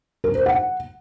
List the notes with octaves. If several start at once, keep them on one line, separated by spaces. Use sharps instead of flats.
A#4
C5
F#5